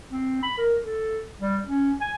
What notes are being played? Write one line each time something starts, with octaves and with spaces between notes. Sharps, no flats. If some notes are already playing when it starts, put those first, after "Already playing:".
C4
B5
A#4
A4
G3
C#4
G#5